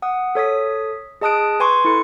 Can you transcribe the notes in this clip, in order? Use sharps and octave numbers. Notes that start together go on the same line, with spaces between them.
F#5 D#6
A4 C#5 D#6 B6
G#4 D#5 A5 D#6 F#6 D7
B4 G#5 C6 C#6
E4 A4 C#7